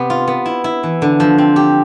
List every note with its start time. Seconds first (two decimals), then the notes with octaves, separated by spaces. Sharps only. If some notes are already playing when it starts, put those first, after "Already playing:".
Already playing: C3 B3
0.10 F4
0.28 B3
0.46 E4
0.64 E4
0.83 E3
1.02 D3
1.20 F3
1.38 C4
1.56 G4